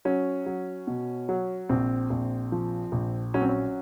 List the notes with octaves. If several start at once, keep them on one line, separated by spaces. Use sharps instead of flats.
F#3 C#4
F#3
B2
F#3
A#1 C4
A#1
F3
A#1
F#3 C#4
C4
C#4